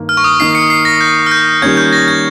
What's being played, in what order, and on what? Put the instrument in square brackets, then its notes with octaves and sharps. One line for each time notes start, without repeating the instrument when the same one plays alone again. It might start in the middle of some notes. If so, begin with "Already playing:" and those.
Already playing: [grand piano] G2 D#3 A#3
[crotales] F6
C#6
D#6
[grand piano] D#3 A#3 D#4 [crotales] C7
[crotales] C#7
C7
A#6
G6
F6
G6
[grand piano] D#3 G3 A#3 C#4 [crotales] G#6
[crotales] G6
A#6
G#6